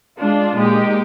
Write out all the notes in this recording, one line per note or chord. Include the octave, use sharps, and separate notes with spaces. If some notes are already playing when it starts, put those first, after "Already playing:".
G#3 D4 F4
A#2 G#3 D#4 G4